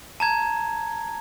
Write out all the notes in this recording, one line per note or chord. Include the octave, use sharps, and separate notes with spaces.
A5 A#5 G#6